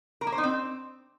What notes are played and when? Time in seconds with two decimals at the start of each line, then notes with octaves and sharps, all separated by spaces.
0.21 A#4
0.27 A#3
0.32 C5
0.38 D#4
0.44 C4